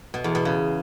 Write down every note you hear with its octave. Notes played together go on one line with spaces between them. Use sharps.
B2
E2
B2
C#3